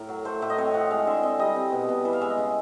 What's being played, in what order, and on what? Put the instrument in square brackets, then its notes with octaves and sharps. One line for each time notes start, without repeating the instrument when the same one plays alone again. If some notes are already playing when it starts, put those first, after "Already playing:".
Already playing: [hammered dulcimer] A2 A#4
F#3
A3 C5
A2 E5
D#5
C4 C#5
F3 F#5
G#3 F5
D3 E5
C4 D#5
G3 D#5
C4
B2
B2
E3 E5
F5
G#3 E5
D#5
C#3